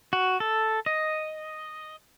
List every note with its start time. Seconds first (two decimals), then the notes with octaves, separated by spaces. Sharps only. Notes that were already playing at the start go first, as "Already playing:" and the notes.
0.13 F#4
0.40 A4
0.86 D#5